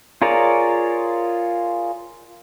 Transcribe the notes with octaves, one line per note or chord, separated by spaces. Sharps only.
F4 G#4 A#4 C#5 D5